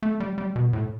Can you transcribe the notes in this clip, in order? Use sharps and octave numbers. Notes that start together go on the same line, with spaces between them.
A3
G3
G3
B2
A2